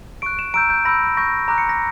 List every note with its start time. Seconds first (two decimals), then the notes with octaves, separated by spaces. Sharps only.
0.22 C#6 F#6 D7
0.39 E7
0.54 A#5 E6 G6 D7
0.70 G6
0.85 B5 E6 G6 A#6
1.17 C#6 G6 A#6
1.48 A#5 D6 F#6 A#6
1.58 C#7
1.69 A#6